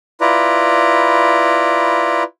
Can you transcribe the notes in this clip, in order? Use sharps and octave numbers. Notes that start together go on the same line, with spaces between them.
E4 F4 B4 D5 A#5